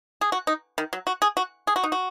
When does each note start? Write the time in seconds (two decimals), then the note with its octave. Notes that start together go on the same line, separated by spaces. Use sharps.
0.21 G#4
0.32 F#4
0.47 D#4
0.78 D#3
0.93 F#3
1.07 F#4
1.22 G#4
1.37 F#4
1.67 G#4
1.76 F#4
1.84 D#4
1.92 F#4